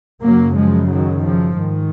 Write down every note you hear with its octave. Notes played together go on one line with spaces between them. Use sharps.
F#2 C#3 F#3 A#3
F3 G#3
D#3 F#3
C#3 F3
G#2 D#3